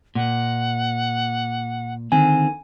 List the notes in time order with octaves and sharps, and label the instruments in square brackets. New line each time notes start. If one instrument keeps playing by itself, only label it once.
[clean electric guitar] A#2 [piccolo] F#5
[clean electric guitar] D3 D#3 C4 [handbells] G#5